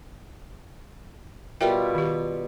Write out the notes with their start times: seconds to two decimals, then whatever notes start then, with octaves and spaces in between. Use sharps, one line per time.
1.61 B2 G3 F4 A#4 E5 G5
1.95 D#3 G4